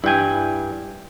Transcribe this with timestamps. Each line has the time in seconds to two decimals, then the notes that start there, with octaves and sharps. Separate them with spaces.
0.04 G2 E4 G5 G#5